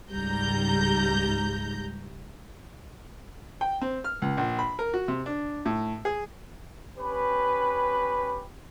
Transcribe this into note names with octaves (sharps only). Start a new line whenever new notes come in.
C#2 G#2 G3 A#5 G6
G5
C4
F6
C#2
A#1
B5
A#4
F#4
C3
D4
A2
G#4
C#4 G4 B4